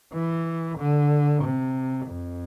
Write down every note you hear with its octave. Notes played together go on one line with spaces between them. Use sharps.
E3
D3
C3
F2